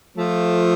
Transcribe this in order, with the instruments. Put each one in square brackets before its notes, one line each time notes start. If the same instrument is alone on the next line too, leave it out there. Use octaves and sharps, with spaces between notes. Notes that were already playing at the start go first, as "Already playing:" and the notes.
[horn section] F3 A3